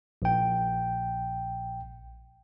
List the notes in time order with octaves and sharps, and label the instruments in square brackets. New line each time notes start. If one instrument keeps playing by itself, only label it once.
[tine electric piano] A#1 G5